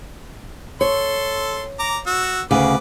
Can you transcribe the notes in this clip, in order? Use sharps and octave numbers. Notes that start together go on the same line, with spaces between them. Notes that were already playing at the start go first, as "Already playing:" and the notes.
A4 C#5 C6
A#5 D6
F#4 E6
D2 C#3 B4 D6